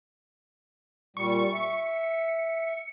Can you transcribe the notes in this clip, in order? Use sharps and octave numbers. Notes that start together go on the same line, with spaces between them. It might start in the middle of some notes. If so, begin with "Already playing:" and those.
A#2 G3 C#6
E5
C#7